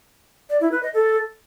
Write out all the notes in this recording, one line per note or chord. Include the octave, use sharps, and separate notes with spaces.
D5
E4
B4
D#5
A4